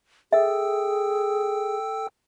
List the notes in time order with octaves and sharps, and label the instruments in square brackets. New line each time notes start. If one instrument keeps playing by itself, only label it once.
[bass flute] G#4 [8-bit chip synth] A4 G5 E6 [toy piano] E5